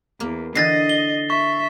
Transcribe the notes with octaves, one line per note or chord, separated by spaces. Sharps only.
E2 A#3
D3 E3 D#5 A6 A#6 C7
G7
E5 C#6